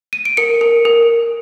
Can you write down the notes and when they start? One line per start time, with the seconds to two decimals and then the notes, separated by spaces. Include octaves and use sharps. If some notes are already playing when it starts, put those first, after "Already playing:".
0.13 D#7
0.25 D7
0.37 A#4 C#7
0.61 A#4
0.85 A#4